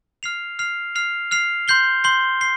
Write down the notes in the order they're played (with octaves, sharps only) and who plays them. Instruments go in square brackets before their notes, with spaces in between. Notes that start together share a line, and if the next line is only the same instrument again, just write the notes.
[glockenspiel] F6 C7 F7
F6 C7 F7
F6 C7 F7
F6 C7 F7
C6 G6 C7 G7
C6 G6 C7 G7
C7 G7